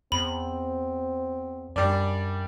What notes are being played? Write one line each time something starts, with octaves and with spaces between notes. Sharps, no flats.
E2 C4 B5
F#2 G3 D4 D5